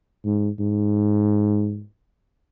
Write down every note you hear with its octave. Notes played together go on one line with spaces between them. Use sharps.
G#2
G#2